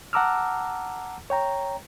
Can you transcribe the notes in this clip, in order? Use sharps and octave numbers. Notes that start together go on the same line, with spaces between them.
F#5 A5 A#5 D6 E6 F6
C#5 G5 A#5